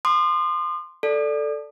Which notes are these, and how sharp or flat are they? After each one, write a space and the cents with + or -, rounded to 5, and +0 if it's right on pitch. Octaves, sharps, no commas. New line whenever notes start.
C6 +0 D#6 -45
A4 +0 D5 +0